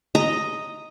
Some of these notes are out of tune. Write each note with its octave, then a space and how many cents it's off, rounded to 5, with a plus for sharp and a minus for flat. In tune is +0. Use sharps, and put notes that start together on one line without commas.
D#5 +0 A#5 -5